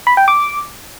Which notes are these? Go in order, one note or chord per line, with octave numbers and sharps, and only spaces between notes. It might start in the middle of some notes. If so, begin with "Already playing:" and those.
B5
G5
D6